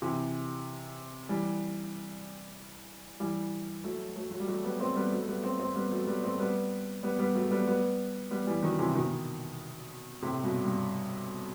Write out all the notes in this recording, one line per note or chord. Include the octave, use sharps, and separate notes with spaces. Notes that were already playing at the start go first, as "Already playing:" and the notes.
C3 E3
E3 G3
E3 G3
F#3 A3
F#3 A3
F#3
G3
F#3 A3
G3 B3
A3 C4
G3 B3
F#3 A3
A3
G3 B3
A3 C4
A3 C4
G3 B3
F#3 A3
G3 B3
A3 C4
G3 B3
G3 B3
G3 B3
F#3 A3
G3 B3
G3 B3
G3 B3
E3 G3
D#3 F#3
C3 E3
B2 D#3
A2 C3
G2 B2
G2